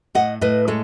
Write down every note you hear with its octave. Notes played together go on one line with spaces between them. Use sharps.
A2 D#5 F#5
A2 B4 D#5
G#3 A4 C#5